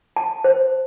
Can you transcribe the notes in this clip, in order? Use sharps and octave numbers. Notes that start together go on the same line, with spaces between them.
A5
C5